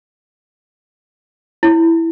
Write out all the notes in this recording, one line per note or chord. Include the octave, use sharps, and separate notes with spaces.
E4